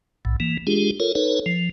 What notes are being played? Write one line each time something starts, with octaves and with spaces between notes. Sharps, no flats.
B1 A2
E3 A#3
G#3 D4 F4 G4 G#4
F4 A4 A#4 C#5
D#4 A4 B4 C#5
F3